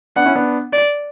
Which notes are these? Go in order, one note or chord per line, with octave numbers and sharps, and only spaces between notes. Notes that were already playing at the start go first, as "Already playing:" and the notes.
B3 D4 F#5
C#4 E4
B3 D4
D5